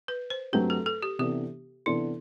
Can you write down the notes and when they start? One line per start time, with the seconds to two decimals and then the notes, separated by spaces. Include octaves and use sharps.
0.08 B4
0.30 C5
0.53 G2 F#3 A3 C4 G4 B4
0.70 A4
0.86 A4
1.03 G4
1.19 C3 E3 B3 D4 G4 A4
1.86 C3 E3 B3 D4 E4 A4